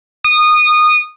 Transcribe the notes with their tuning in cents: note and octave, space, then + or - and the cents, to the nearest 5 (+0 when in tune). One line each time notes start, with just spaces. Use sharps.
D#6 -20